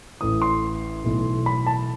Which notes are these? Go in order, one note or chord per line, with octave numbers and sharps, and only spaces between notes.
A1 A2 E3 D#6
C6
B1 A2 E3
B5
A5